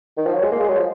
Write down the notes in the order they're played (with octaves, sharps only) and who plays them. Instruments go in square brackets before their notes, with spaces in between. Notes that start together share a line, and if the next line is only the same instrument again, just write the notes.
[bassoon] D#3
F3
F#3
G#3
A#3
G#3
F#3
F3